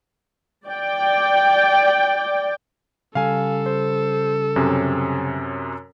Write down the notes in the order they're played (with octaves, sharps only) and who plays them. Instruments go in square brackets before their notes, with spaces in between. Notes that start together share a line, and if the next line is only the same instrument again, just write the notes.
[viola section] D5 G5
[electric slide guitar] C#3 G3 [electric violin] A4 [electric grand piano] F5 G#5
[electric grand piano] C5
F#2 C3 C#4